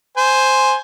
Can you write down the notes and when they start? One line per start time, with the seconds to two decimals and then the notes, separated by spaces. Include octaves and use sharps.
0.17 C5 G#5